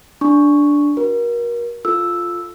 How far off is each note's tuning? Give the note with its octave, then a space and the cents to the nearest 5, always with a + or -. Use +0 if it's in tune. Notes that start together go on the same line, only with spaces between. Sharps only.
D4 -5 C#6 +0
F#4 +10 A#4 +30
F4 +0 A4 +0 E6 +0